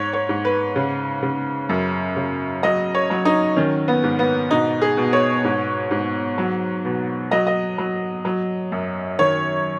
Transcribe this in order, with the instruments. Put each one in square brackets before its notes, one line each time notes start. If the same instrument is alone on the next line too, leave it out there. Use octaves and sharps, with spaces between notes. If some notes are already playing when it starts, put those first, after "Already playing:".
Already playing: [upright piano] G#2 C#5
C#5
G#2
B4
C#3
C#3
F#2
C#3
F#3 D#5
C#5
F#3
D#4
D#3 C#4
B3
G#2
B3
B2 D#4
G#4
B2
C#5
G#2
G#2
F#3
B2
F#3 D#5
D#5
F#3
F#3
F#2
D#3 C#5